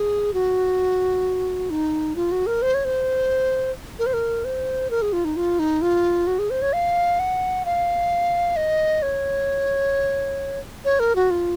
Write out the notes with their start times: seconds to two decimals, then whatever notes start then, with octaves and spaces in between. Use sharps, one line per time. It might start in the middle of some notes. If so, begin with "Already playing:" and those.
Already playing: G#4
0.34 F#4
1.70 D#4
2.16 F4
2.32 F#4
2.47 A#4
2.62 C5
2.74 C#5
2.85 C5
3.99 A#4
4.06 C5
4.13 A#4
4.45 C5
4.90 A#4
5.02 G#4
5.13 F4
5.25 D#4
5.36 F4
5.59 D#4
5.82 F4
6.27 F#4
6.39 G#4
6.50 C5
6.62 C#5
6.73 F5
7.19 F#5
7.65 F5
8.56 D#5
9.02 C#5
10.85 C#5
11.00 A#4
11.16 F#4
11.30 F4